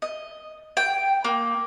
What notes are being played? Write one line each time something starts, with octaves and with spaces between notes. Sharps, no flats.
D#5
G5
A#3